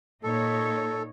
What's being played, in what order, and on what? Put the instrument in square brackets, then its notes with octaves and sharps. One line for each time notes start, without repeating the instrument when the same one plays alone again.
[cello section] A#2 D#4 C#5 [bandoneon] A4